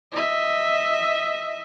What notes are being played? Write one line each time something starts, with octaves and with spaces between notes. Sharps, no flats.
D#5 E5